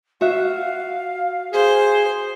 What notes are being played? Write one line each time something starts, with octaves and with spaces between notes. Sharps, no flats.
F#4 E5 F5
G#4 C5